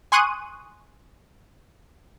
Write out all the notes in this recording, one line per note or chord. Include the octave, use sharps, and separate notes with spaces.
G#5 C6 C#6 D#6 F#6 D#7